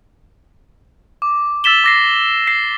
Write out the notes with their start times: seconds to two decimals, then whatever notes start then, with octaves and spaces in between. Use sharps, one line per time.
1.22 D6
1.64 E6 A6 B6 E7 G7
1.84 D6 A#6 C7
2.47 A#6 C7